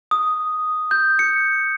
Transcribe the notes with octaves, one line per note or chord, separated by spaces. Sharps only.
D#6
G6
C#7